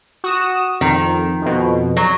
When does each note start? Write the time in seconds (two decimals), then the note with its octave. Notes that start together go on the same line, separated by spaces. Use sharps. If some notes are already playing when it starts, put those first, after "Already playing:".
0.24 F#4 D#6 E7
0.81 F2 D#3
1.42 F2 B2
1.97 F#3